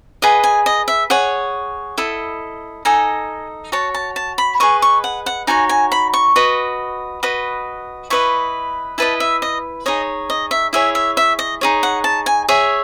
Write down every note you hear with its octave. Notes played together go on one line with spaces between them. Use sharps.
G#4 B4 D#5 F#5
G#5
D#5
E5
G#4 C#5 F#5
E4 A4 D#5
D#4 A4 D#5 G#5
F#4 C#5 A5
A5
A5
B5
G#4 B4 D#5 C#6
C#6
F#5
F#5
D#4 F#4 C#5 G#5
G#5
B5
C#6
F#4 B4 D#5
F#4 B4 D#5
E4 B4 D#5 C#6
E4 B4 D#5 A5
E5
D#5
D#4 G#4 C#5 D#5
D#5
E5
E4 G#4 C#5 E5
E5
E5
D#5
D#4 G#4 C#5
F#5
A5
G#5
G#4 C#5 E5